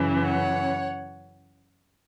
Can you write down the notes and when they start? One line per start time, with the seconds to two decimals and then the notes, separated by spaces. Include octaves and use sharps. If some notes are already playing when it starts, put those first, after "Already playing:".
Already playing: F#2 C#3 E3
0.23 C#5 F#5